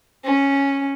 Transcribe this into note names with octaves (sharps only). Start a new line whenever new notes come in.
C#4